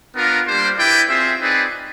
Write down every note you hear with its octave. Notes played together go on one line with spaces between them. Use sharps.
B3 D4 F4 A#4
G3 A#3 D4 G4 C5
E4 G4 B4 D5 G5
C4 F4 G#4 C5 E5
C4 D#4 G#4 B4 D5